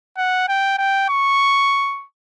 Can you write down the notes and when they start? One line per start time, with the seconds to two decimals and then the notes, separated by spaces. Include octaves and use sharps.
0.17 F#5
0.49 G5
0.78 G5
1.09 C#6